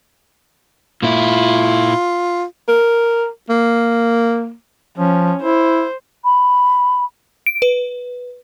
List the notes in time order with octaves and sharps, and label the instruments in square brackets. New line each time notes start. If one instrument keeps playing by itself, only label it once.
[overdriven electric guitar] A#2 E4 [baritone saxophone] F4
[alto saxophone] A#4
A#3
[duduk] F3 [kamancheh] C#4
[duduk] E4 [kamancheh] C5
[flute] B5
[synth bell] D7
B4